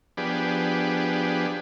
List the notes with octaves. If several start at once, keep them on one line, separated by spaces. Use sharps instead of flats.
F3 B3 D4 G4 G#4 B4